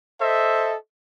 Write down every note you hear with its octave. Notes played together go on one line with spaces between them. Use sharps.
A4 C5 D#5 E5